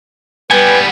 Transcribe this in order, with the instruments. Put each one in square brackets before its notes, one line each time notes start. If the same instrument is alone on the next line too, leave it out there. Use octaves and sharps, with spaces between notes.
[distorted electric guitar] G3 B3 [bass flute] B4 [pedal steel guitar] G5 G#5